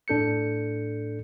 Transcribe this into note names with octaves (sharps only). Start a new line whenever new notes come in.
A2 D4 A4 G6 C#7